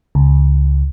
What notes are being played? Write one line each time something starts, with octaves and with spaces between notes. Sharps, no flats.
C#2